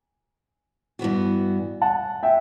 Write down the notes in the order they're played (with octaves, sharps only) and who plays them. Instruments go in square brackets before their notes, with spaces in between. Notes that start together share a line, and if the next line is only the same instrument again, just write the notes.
[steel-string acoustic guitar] G2 E3 B3 F#4
[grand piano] F#5 A5
E5 G5